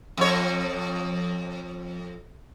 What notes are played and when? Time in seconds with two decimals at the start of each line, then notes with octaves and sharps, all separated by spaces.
0.17 F2 C#5